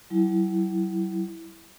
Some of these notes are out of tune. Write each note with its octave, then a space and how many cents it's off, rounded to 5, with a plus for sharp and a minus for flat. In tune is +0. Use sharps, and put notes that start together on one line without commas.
F#3 +40 E4 +0